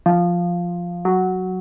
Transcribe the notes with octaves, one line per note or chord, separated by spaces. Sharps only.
F3
F#3